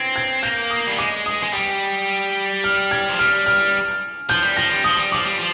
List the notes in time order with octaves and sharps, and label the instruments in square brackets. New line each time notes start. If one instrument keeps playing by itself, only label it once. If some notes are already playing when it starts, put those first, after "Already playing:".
Already playing: [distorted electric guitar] C4 [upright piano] G#6 A#6
[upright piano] G#6
[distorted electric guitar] A#3 [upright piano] G6
[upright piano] D#6
[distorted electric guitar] G3
[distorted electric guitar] G#3 [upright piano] D6
[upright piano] D#6
[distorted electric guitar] G#3
G3
[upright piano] F6
G#6
[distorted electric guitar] F3
[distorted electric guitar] G3 [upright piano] F6
[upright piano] F6
[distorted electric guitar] F3 [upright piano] G6
[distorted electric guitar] G3
[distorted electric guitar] F3 [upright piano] A#6
[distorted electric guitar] G3
[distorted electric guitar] F3 [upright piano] D#6
[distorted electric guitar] G3
[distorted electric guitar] F3 [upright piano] D6
[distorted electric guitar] G3
F3